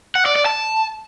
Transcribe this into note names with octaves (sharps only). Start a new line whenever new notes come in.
F#5
D5
D5
A5